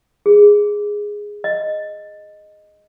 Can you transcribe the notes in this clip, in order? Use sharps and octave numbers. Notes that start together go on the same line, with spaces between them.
G#4
D#5